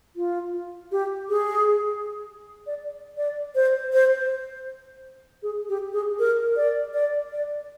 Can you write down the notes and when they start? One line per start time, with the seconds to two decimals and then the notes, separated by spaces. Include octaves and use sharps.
0.16 F4
0.92 G4
1.30 G#4
2.67 D5
3.17 D5
3.55 C5
3.93 C5
5.43 G#4
5.69 G4
5.93 G#4
6.19 A#4
6.56 D5
6.94 D5
7.32 D5